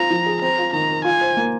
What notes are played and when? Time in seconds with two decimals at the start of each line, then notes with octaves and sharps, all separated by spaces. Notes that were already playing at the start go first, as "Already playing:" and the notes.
Already playing: C4 F4 A#5
0.10 F3
0.26 G#4
0.42 C4 A#5
0.58 F4
0.73 D#3 A#5
0.89 A#4
1.04 F4 G#5
1.21 C5
1.37 A#3